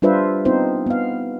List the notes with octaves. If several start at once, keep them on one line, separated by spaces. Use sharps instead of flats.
G3 D4 F4 B4 C5 E5
B3 C4 D#4 F4 C5
B3 F5